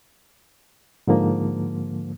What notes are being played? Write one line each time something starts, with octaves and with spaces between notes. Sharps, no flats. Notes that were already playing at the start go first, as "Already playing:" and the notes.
G#2 D3 F3 A#3